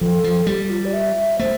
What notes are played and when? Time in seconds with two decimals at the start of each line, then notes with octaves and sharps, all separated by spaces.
0.01 F3 A4
0.24 F3
0.47 G3 G4
0.70 F4
0.85 D5
0.93 E5
1.39 A3 C5